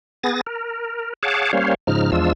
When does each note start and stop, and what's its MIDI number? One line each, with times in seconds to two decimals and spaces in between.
0.24 0.41 59
0.24 0.41 68
0.24 0.41 93
0.24 0.41 94
0.47 1.13 70
1.23 1.52 68
1.23 1.52 73
1.23 1.52 77
1.23 1.52 78
1.23 1.52 81
1.23 1.52 86
1.53 1.74 55
1.53 1.74 58
1.53 1.74 61
1.53 1.74 72
1.53 1.74 73
1.53 1.74 77
1.87 2.11 44
1.87 2.11 49
1.87 2.11 53
1.87 2.11 63
1.87 2.11 89
2.12 2.33 40
2.12 2.33 53
2.12 2.33 56
2.12 2.33 62
2.12 2.33 65
2.12 2.33 88